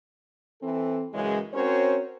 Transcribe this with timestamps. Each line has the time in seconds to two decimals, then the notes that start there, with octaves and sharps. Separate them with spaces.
0.61 E3 C4 A4
1.12 F#2 C#3 E3 G#3
1.53 C4 C#4 F#4 A#4 C5 C#5